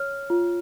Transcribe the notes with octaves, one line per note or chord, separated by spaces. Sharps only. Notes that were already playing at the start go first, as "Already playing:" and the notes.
Already playing: C#5 F6
F4